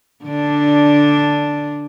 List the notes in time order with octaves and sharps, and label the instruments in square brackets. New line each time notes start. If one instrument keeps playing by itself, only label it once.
[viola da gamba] D3 D4